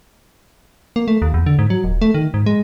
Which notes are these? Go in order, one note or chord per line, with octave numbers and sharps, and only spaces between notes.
A#3
A3
D#2
E2
D3
G#2
F#3
D#1
A3
D#3
G#2
G#3